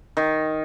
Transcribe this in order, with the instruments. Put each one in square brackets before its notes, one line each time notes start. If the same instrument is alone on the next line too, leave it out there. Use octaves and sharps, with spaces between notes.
[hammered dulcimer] D#3